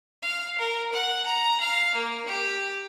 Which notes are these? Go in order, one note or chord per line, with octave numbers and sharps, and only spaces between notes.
F5
A#4
F#5
A#5
F5
A#3
G4